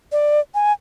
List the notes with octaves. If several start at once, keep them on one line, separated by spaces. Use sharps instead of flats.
D5
G#5